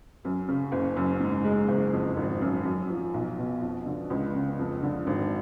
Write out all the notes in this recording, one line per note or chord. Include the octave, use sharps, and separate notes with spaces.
F#2
C#3
F#1
F#2
G#2
G#3
F#1
F2
G#1
F#2
F#2
F3
B1
B2
F2
D3
C#2
C#3
F2
D3
G#1